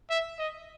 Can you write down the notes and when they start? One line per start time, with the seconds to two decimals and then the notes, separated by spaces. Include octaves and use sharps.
0.10 E5
0.39 D#5